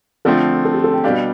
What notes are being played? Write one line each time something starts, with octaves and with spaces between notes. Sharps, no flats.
D3 F3 A3 C4 A4
A4
G4
A4
G5
B2 G3 D4 G4 F5